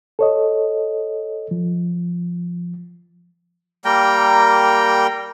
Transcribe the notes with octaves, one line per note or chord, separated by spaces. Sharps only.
A4 C#5 D#5
F3
G3 A#3 A#4 G5